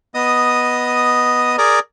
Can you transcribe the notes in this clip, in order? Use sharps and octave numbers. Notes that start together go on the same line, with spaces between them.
B3 D#5 D#6
G#4 A#4 D5